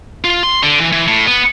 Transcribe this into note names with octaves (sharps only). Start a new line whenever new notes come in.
F4
C6
D3
E3
E3
A2
B3